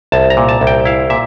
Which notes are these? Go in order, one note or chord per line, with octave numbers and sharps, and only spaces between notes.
C2 A5
A#5
A#2
A5
C2
G5
E4 F5
A#2 E5